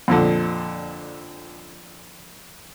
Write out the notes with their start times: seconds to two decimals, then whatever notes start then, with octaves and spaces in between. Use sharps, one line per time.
0.08 F2 A#2 D3